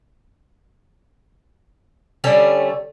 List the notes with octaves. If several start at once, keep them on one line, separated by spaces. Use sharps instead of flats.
D3 G3 A3 C#4